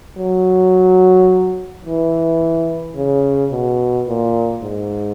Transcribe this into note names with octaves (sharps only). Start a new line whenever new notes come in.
F#3
E3
C#3
B2
A#2
G#2